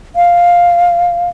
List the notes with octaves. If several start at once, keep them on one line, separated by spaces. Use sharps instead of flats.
F5